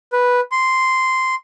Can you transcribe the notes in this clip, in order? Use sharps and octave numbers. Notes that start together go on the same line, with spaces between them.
B4
C6